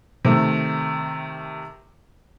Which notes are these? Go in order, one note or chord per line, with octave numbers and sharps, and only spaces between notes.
C3 D#3 A3